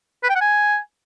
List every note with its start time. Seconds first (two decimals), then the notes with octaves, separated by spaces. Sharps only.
0.23 B4
0.29 G5
0.35 F#5
0.41 G#5